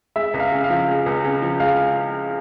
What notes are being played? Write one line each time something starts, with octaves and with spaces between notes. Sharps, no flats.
G#3 E5
C#2
F5
C#3
F5
F3
G#3
C#2
C#3
F3
G#3 F5